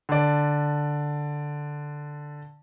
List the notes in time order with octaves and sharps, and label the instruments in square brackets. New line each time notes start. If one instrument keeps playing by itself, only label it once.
[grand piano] D3 D5